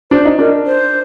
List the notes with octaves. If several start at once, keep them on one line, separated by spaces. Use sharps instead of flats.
D4 C5
D#4
D4 A#4
C5